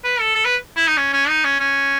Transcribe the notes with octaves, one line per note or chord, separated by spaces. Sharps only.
B4
A4
A4
B4
E4
D#4
C#4
C#4
D#4
C#4
C#4